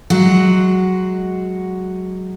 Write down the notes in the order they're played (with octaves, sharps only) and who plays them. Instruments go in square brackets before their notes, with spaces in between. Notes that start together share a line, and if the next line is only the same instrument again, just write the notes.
[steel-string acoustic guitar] F#3 G#3 F#4